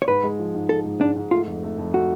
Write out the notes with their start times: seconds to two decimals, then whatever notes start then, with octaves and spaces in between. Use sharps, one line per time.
0.02 C#5
0.07 G#2 B4
0.23 G#3
0.39 F3
0.54 G#2
0.69 G#3 A4
0.85 G#2
1.01 G#2 D4
1.16 G#2
1.31 A3 F4
1.47 F2
1.63 A3
1.78 F2
1.93 A3 F#4